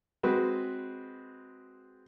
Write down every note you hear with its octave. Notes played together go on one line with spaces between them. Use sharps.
G#3 C4 F#4 B4